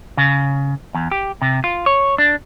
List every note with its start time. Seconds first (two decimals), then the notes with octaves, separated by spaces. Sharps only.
0.17 C#3
0.94 E2
1.11 G4
1.42 C3
1.64 F4
1.86 C#5
2.18 D4